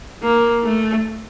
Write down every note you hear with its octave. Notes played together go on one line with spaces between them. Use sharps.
A#3
A3